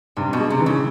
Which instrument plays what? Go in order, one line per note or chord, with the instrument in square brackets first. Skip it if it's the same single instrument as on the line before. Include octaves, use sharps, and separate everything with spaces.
[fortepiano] G2 [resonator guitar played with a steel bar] C3
[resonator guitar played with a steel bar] B2
[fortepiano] G#3
[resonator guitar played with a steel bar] C3
[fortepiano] E3
[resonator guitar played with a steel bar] C#3